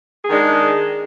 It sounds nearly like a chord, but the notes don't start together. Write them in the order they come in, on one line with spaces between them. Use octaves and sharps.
G#4 D4 D#3 G#3